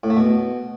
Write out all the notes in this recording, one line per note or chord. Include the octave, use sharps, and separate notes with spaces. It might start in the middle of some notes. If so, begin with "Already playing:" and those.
A2
A3
B2